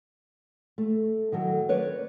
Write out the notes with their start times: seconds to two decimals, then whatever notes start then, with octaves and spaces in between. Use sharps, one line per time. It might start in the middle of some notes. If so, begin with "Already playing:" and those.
0.78 A3
1.32 D#3 F#3 A4
1.69 A#4 B4 C#5 D5